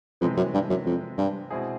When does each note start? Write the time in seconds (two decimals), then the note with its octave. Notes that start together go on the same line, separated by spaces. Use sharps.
0.21 F2 C3 E3 G#3 B3
0.37 F#2
0.54 G2
0.70 F#2
0.86 F2
1.18 G2
1.50 B2 G#3 C4 E4 G#4